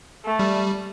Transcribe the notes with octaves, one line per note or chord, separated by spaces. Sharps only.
A3
G3